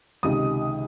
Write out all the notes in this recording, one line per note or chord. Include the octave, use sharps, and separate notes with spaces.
C#2 C3 D#3 D#6